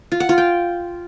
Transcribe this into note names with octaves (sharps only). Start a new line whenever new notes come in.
F4
F#5
F4
G5